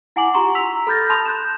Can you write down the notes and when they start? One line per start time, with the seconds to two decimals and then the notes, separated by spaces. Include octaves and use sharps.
0.16 E4 F#5 G#5 D6 F#7
0.34 F4 G4 A#5 C6 C#6
0.55 A#5 E6 B6 F7
0.87 A4 B5 F6 G6 A6 A#6
1.10 A5 B5 C6 D#6 F7
1.25 F#6 G6 E7